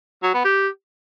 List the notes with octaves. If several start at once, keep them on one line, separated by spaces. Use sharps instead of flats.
F#3
B3
G4